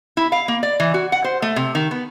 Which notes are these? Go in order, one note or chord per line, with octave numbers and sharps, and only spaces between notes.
E4
F5
A#3
D5
E3
F#4
F#5
C5
A3
C3
D#3
B3